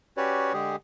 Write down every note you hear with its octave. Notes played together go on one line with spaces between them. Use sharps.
C#4 F#4 G4 B4 C#5 D5
D3 G#3 G4 G#4